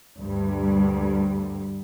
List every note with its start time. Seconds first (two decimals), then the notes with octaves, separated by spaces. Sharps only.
0.17 D2 G2 G3